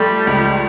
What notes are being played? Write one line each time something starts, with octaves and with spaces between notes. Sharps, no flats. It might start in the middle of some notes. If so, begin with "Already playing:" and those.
Already playing: F3 G3 A3
C#2